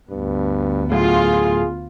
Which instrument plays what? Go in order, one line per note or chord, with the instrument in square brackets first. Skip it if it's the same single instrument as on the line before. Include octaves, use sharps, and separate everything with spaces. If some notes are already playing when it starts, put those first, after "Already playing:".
[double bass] D2 B3 [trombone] G2
[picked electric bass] A2 F#3 [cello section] F4 [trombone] G#4